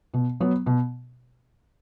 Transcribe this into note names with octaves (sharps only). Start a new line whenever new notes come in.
B2
F#3 B3
B2